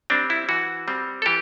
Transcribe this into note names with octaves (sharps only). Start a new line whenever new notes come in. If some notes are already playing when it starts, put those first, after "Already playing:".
G3 C4 D4
E4
E3 F#4
G3 C4
A4
E3 G4